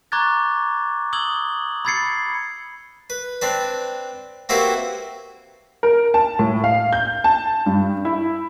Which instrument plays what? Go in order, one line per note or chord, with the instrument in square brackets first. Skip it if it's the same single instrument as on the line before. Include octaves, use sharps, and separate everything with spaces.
[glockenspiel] A#5 C#6 D6 F#6 G#6 A6
D#6 E6 G#6 F#7 G7
B5 E6 G#6 A6 C7 C#7
[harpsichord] B4
C4 D4 B4
A#3 C4 E4 F#4 G4 B4
[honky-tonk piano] A#4
A5
A2
F5
G6
A5
G2
E4